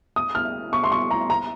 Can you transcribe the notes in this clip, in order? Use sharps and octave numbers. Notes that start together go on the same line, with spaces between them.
D#6
F6
C#6
C6
C#6
A#5
A#5